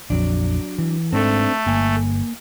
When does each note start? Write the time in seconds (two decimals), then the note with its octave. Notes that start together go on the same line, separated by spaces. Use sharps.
0.10 A#1 F2 F#3 D4
0.79 E3
1.13 G#2 A3 C4 D4 A4
1.67 G1 A#3 G#5